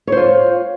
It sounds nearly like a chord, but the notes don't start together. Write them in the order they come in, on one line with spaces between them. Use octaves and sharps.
C#5 C5 F4